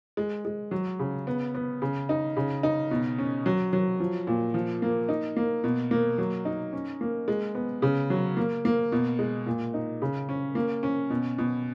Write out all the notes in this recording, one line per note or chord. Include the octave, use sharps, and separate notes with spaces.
G#3
G#3
F#3
C#3
B3
B3
C#3
D#4
C#3
D#4
B2
C#4
F#3
F#3
F3
A#2
F3
A#3
D#4
A#3
B2
A#3
F#3
D#4
C#4
A#3
G#3
B3
C#3
F#3
A#3
A#3
B2
G#3
A#2
D#4
C#3
C#4
A#3
C#4
B2
B2